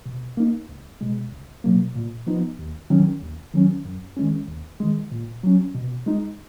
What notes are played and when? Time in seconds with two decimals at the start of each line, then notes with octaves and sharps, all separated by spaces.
0.06 B2
0.37 A#3 D#4
0.69 C#2
1.01 B2 G#3
1.32 C#2
1.64 B2 F#3 A#3
1.95 A#2
2.27 F3 B3 D#4
2.59 D#2
2.90 D#3 F#3 C#4
3.22 D#2
3.54 D#3 F#3 C#4
3.85 F#2
4.17 D#3 G#3 C#4
4.48 D#2
4.80 D#3 G#3
5.12 A#2
5.43 F#3 C#4
5.75 B2
6.06 G#3 D#4